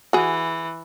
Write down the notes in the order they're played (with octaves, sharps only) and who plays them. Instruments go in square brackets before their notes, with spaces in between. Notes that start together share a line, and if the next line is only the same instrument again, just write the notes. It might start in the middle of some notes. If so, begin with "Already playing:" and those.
[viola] E3 [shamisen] F#4 G#4